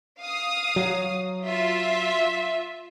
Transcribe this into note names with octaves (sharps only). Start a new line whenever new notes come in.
F5 D#6
F#3
F4 E5